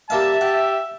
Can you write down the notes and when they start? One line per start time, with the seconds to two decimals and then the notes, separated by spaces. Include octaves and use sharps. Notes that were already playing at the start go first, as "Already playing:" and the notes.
0.10 G3 A#3 E5 F5 A5
0.41 G4 F#5